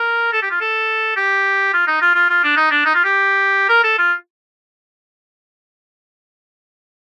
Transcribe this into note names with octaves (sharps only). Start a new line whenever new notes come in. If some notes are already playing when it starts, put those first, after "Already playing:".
Already playing: A#4
A4
G4
F4
A4
G4
F4
D#4
F4
F4
F4
D4
D#4
D4
D#4
F4
G4
A#4
A4
F4